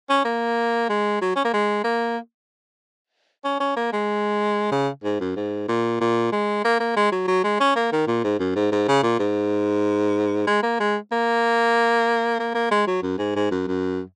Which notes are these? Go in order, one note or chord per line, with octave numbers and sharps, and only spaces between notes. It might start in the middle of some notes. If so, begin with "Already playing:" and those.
C#4
A#3
G#3
F#3
C#4
A#3
G#3
A#3
C#4
C#4
A#3
G#3
C#3
G#2
F#2
G#2
A#2
A#2
G#3
A#3
A#3
G#3
F#3
F#3
G#3
C#4
A#3
D#3
A#2
G#2
F#2
G#2
G#2
C#3
A#2
G#2
G#3
A#3
G#3
A#3
A#3
A#3
G#3
F#3
F#2
G#2
G#2
F#2
F#2